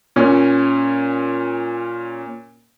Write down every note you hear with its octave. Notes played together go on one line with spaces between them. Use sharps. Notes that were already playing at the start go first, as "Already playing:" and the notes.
A#2 C#4